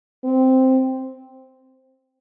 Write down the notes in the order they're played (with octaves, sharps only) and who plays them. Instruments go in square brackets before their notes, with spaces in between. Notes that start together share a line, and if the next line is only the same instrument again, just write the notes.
[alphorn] C4